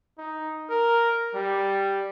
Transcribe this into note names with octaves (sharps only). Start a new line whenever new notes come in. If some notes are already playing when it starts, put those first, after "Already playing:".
D#4
A#4
G3